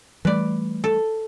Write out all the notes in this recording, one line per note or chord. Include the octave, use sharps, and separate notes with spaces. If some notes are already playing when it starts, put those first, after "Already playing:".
E3 G3 A3 B4 D5
A4